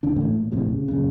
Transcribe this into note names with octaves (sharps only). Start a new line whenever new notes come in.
D#2 D3 D4
A1 A2 E3 A3
A#2
A#1 F2 A2 C3
C#3
F#2 A#2 C#3